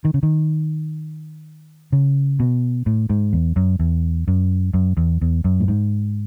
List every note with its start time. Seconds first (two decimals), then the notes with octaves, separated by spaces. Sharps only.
0.05 D#3
0.14 C#3
0.23 D#3
1.92 C#3
2.40 B2
2.86 A2
3.10 G#2
3.33 E2
3.56 F#2
3.79 E2
4.28 F#2
4.74 F#2
4.97 E2
5.21 E2
5.44 F#2
5.60 A2
5.68 G#2